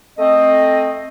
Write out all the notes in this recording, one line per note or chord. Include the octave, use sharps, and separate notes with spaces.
A3 C4 D#5